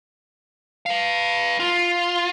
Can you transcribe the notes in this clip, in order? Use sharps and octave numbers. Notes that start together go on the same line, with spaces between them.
B4 F5
F4